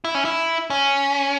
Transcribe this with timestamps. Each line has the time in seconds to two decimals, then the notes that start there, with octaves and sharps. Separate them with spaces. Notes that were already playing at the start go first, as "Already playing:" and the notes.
0.05 E4
0.15 C#4
0.25 E4
0.70 C#4